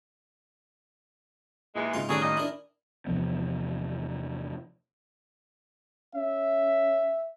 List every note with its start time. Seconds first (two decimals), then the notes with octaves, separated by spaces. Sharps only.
1.75 D#2 A#2 E3 G#3
1.94 G#2 C#3 D#4 F4 C6
2.09 A2 D#3 F#3 G3 C#4 G#4 A4 D5
2.22 A#2 D#5
2.37 D4 E4 A#4 D5
3.07 E2 C3 F3 B3
6.15 C#4 E5